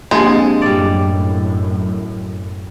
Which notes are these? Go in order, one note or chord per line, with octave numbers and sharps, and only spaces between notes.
D3 F3 G#3 A#3 C4 G4
F#2 A2 G3 D5